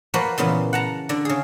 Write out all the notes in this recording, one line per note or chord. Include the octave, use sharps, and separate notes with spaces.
F3 A#3 F#4 B4 C5 D5
A#2 C#3 E3 B3
F#5 A5 A#5
D3 D5
C#3 G#4